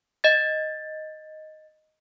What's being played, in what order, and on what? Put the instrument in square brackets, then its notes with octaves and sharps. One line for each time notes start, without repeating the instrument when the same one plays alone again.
[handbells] D#5 A6